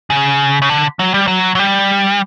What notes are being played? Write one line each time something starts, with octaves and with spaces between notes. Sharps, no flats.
C#3
C#3
D3
F#3
G3
F#3
F#3
G3